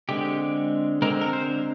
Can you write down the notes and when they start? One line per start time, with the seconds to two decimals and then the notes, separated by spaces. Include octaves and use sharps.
0.09 D3 G#3 C4 G4
1.02 D3 G#3 C4 A#4
1.21 A#4
1.33 C5